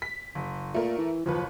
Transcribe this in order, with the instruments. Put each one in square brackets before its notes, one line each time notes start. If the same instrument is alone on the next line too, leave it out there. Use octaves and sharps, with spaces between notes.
[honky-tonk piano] B6
F#1
[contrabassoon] A#2 [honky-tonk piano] A3 A#4
[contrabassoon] E3
[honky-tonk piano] F#1 D#2 B4 [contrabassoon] F3